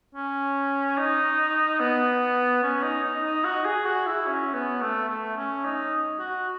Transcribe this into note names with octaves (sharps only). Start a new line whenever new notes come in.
C#4
D#4
B3
C#4
D#4
D#4
D#4
F#4
G#4
F#4
E4
C#4
B3
A3
A3
C#4
D#4
F#4